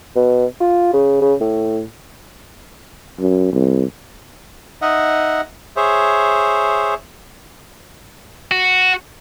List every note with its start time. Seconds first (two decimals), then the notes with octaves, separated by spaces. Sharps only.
0.16 B2
0.60 F4
0.93 C#3
1.21 C#3
1.40 A2
3.19 F#2
3.52 C2
4.82 D#4 D#5 E5 F#5
5.76 G#4 C5 C#5 E5
8.51 F#4